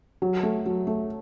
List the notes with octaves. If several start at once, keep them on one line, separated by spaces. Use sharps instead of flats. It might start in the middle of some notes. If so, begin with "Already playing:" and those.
F#3
A3
F#3
A3